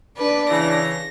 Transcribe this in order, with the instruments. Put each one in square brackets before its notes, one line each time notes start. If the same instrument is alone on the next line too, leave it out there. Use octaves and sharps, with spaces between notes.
[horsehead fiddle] D4 D5 [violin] B4
[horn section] C#3 E3 [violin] A#6